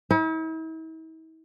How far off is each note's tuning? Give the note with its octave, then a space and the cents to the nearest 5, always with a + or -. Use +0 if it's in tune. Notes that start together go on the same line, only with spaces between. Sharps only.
E4 -45